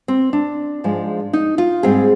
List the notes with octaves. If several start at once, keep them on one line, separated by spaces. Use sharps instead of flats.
C4
D4
G#2 F3 G#3
D#4
F4
G#2 G3 C4 G#4